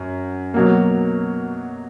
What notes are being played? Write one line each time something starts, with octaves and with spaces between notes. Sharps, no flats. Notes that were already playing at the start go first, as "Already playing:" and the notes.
Already playing: F#2
B2 F#3 A#3